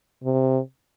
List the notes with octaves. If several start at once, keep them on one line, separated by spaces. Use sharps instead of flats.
C3